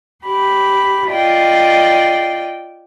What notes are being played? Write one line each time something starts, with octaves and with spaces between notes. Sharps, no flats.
G4 B5
F4 D5 D#5 G5